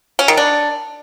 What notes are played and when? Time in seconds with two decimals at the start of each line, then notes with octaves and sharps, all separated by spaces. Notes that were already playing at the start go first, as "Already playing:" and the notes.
0.19 C#4
0.28 D#3
0.37 D4